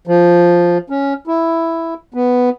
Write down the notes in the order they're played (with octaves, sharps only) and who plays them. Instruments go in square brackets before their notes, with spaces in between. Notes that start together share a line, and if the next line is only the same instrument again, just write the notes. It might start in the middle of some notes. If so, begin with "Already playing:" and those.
[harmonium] F3
C#4
E4
B3